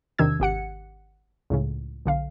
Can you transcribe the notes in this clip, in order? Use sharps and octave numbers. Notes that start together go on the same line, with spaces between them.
E2 C3 D#3 D4 E6 G#6
G#1 G4 F#5 C#7
C#2 A2 C#3
B1 D3 F5